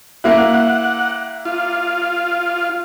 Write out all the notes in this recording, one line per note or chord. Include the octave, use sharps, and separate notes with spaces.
A#3 E4 F#5
F4